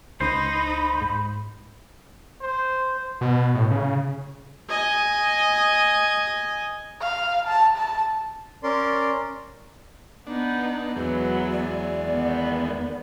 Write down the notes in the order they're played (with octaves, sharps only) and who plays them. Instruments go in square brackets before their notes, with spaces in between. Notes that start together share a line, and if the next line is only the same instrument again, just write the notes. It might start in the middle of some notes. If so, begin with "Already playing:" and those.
[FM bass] C#2 [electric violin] D#4 [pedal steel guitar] C5 [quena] B5
[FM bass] G#2
[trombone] C5
[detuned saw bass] B2
A2
C#3
[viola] D#5 G#5
[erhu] F5
A5
A5
[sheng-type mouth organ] C#4 A#4 D5 C6
[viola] B3 D#4 [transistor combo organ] D4
[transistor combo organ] E2 G#3 [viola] F#3 B3 [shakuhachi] B4
[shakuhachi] D5
[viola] D#3 B3